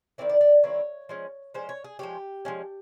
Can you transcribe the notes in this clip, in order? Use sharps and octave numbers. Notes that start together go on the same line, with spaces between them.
D#3 G3 C4 E4 D5
D5
D5
D#3 G3 C4 E4 C#5
F3 G#3 C#4
F3 G#3 C#4 C5
C#5
G#4
F3 G#3 C#4 G4
F3 G#3 C#4